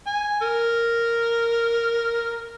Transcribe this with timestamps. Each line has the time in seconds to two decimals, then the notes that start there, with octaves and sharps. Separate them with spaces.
0.07 G#5
0.42 A#4